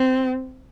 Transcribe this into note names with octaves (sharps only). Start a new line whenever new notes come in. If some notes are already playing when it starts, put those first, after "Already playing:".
Already playing: C4